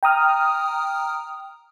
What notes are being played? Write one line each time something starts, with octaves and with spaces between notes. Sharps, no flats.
G5 A#5 D#6 F6